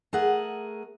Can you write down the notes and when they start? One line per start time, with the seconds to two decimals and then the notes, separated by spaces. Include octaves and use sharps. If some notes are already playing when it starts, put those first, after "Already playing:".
0.13 A3 G#4 A#4 F#5